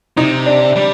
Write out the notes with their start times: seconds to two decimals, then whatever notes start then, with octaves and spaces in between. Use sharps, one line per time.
0.17 C3 D#4
0.46 D4
0.76 G3 D4